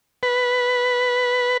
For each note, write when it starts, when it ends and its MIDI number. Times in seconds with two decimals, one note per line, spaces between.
0.23 1.57 71